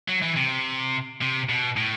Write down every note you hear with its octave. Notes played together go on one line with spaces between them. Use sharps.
F#3
E3
C3
C3
B2
A2